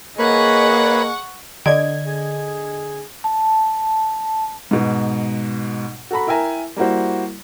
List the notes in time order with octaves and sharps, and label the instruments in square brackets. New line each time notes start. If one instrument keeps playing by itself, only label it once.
[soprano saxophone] A#3 [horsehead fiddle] G#4 D#5 [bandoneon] B4 C#5 B5 [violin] F#5 C#6
[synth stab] D3 G#6 [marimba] D5 [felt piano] D#5
[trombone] G#4
[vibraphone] A5
[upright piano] G#2 B2
F#4 A4 A#5 B5
E4 A#4 E5 G5 G#5 A#5
G3 A#3 E4 F#4 C5